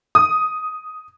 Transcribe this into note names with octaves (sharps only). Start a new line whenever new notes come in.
D#6